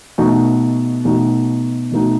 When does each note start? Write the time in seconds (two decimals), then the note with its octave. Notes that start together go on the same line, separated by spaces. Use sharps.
0.18 B2 A3 D#4 F#4
1.05 B2 A3 D#4 F#4
1.92 B2 A3 D#4 F#4